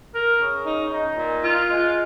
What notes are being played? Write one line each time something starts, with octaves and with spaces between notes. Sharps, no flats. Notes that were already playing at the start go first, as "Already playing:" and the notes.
A#4
C#3
D#4
D#4
A#2
F4
G#3